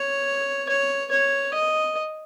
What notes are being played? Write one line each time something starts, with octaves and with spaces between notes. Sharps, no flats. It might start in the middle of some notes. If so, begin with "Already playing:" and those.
Already playing: C#5
C#5
C#5
D#5